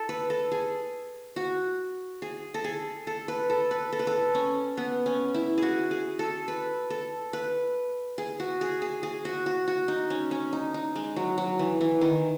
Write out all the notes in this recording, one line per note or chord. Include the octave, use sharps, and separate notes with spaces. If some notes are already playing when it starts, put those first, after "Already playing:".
Already playing: A4
B4
A4
G#4
F#4
G#4
A4
G#4
A4
B4
A4
B4
A4
B4
A4
C#4
B3
C#4
E4
F#4 G#4
G#4
A4
B4
A4
B4
G#4
F#4
G#4
G#4
G#4
F#4
F#4
F#4
D#4
C#4
C#4
D#4
D#4
G#3
F#3
F#3
E3
E3
D#3